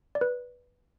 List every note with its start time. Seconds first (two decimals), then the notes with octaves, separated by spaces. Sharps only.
0.15 D5
0.21 B4